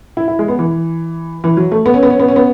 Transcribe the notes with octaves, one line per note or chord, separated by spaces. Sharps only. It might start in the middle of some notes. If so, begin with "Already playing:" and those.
E4
E4
G#3
B3
E3
E3
F#3
A3
B3
C#4
B3
C#4
B3
C#4
B3